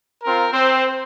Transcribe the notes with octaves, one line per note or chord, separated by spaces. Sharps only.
C4 F4 A#4
C4 C5